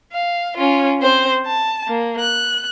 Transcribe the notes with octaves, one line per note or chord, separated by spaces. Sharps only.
F5
C#4 F4
C4 C5
A5
A#3
F#6